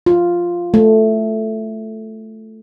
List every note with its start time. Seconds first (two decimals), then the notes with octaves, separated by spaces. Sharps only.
0.06 F4
0.74 A3